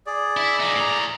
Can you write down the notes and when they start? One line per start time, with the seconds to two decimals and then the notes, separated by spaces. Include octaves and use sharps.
0.07 G#4 D5
0.37 E4
0.60 F3 D#4
0.76 A2 A#5